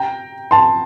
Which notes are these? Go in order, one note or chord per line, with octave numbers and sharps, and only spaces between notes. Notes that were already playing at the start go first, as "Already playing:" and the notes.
Already playing: G5 A#5
A5 C6